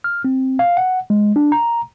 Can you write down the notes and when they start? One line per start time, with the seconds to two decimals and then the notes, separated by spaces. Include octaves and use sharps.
0.04 F6
0.24 C4
0.59 F5
0.77 F#5
1.10 G#3
1.36 D4
1.52 A#5